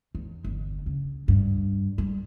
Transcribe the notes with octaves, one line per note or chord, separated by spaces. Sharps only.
E2
G1
C#3
G2
G3